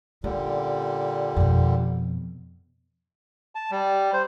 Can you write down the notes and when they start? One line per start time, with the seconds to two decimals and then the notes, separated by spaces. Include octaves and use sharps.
0.24 A#2 D3 G3 C#4
1.36 F2 B2
3.55 A5
3.71 G3
4.13 C5